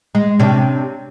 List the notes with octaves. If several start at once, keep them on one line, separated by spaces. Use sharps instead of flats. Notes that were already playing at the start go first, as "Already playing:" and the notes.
G#3
C3 C#4 D4